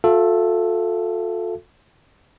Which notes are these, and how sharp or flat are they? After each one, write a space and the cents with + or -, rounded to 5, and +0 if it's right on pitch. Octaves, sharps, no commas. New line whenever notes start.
F4 +45 A4 +0 E5 +40